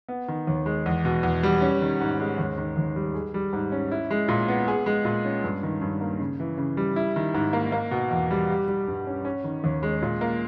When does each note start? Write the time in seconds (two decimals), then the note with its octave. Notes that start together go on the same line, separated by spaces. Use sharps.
0.08 B3
0.28 D#3
0.47 D#2
0.66 G#3
0.86 E2
1.05 B2
1.23 E2
1.43 G3
1.61 C#4
1.81 D#3
2.01 G#2
2.20 G#3
2.38 D#2
2.58 D#3
2.77 D#2
2.96 G3
3.14 G#4
3.34 G3
3.53 G#2
3.72 C#4
3.91 E4
4.11 G#3
4.28 A#2
4.48 B3
4.68 G#4
4.86 G#3
5.05 A#2
5.25 C#4
5.44 G2
5.63 D#3
5.81 G2
6.01 A#3
6.19 C#3
6.40 E3
6.58 C#3
6.77 G3
6.96 E4
7.16 D#3
7.34 G#2
7.53 A#3
7.72 A#3
7.91 B2
8.11 E2
8.31 G3
8.50 G4
8.68 G3
8.88 G2
9.07 C#4
9.25 C#4
9.44 D#3
9.64 D#2
9.83 G#3
10.02 A#2
10.21 A#3